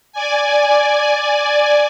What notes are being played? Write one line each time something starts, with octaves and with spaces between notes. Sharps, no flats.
D5 G#5